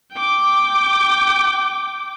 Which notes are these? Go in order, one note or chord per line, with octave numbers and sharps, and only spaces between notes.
G5 D6